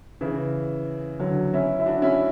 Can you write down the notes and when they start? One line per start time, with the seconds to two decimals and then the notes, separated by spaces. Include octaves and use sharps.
0.21 C#3 E3
1.19 D3 F#3
1.53 C#4 E4
1.80 E4
1.86 D4 F#4
2.02 C#4 E4